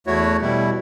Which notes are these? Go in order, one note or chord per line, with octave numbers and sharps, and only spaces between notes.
E2 A3 E4 F#4 C#5
B2 G3 E4